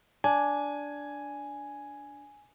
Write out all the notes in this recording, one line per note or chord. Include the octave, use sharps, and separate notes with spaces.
D4 G#5